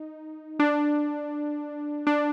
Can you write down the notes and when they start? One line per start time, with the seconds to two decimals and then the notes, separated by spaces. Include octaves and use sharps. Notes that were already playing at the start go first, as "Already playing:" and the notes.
Already playing: D#4
0.59 D4
2.07 D4